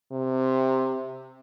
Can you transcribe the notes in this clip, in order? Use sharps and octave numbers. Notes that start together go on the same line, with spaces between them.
C3